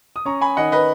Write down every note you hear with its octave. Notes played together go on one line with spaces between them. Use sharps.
D#6
C#4 A#5 C#6
G#5 B5
D#3 D#5 F#5
B4 D#5